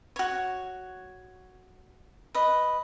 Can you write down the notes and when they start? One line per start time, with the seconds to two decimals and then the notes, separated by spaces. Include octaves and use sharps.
0.16 F#4 C#5
2.34 B4 D#5